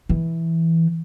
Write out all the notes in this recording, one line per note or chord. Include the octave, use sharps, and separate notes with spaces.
E3